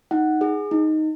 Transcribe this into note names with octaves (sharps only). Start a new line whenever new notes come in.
D#4 F#5
G#4
D#4